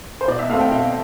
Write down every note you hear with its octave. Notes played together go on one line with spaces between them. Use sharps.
C5
B2 D5
E5
A3 C4 F5
G5
B2 F5